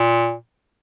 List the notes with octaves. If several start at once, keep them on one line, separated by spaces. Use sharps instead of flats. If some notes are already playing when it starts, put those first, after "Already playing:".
Already playing: A#2